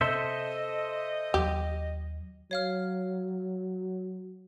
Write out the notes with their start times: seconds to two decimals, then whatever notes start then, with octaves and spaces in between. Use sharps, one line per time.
0.01 C3 A4 C5 D#5 E5
1.34 D#2 F#3 G4
2.51 F#3 C#5 F5 F6